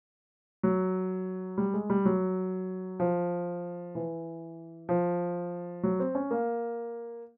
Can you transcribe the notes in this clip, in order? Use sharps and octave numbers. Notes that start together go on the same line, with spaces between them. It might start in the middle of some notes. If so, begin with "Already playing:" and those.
F#3
G3
G#3
G3
F#3
F3
E3
F3
F#3
C4
C#4
A#3